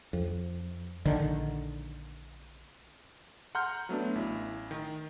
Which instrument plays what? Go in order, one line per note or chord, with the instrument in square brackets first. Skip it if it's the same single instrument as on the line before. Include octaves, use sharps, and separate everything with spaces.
[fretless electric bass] F2
A#1 D3 D#3
[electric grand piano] F#5 A#5 C6 F6 G6
F#3 A3 B3 D4
A1 E4
D#3